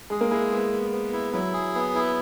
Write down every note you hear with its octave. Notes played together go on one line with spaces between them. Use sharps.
G#3 G#4
A#3
G#3 E4
B3
B3
B3
E4
F#3 E4
G#4
B3
E4